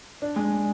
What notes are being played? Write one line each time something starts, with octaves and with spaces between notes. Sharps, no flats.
D4
G#3